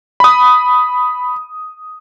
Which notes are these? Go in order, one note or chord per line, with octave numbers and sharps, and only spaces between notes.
B5 D#6